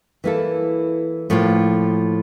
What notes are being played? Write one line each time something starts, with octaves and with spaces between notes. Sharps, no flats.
E3 A#3 E4 A4
A2 F3 A#3 F4